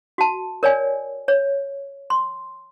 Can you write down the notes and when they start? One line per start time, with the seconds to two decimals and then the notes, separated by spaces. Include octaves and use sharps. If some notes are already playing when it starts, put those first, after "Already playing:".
0.18 F#4 A5
0.63 A#4 C#5 D5 G#5
1.28 C#5
2.10 C6